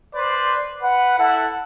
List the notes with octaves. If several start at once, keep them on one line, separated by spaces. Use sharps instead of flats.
B4 C5 D5
B4 F#5
E4 A4 F#5